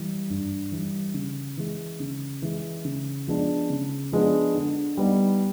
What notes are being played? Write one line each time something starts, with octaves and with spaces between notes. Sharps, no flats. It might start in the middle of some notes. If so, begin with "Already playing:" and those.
Already playing: E3 G3
G2
E3 G3
C#3
E3 G#3
C#3
E3 G#3
C#3
F3 G#3 B3 D4
C#3
F3 G#3 B3 D4
D3
G3 B3 D#4